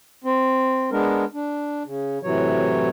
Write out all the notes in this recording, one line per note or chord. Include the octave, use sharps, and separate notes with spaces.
C4
G#3 B3 D4 A#4
D4
C#3
A2 C3 E3 F#3 C#5